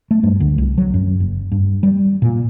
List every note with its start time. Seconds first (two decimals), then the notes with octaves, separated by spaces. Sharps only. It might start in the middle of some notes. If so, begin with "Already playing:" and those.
0.11 A3
0.23 G2
0.40 D2
0.58 C2
0.78 F#3
0.94 F#2
1.20 F#1
1.52 G2
1.83 G3
2.22 A#2